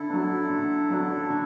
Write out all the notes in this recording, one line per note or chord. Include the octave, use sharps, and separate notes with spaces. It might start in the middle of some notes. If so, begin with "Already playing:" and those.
Already playing: D3 E4 A4
F#3 D4
D3
F#3 D4
D3 D4 F#4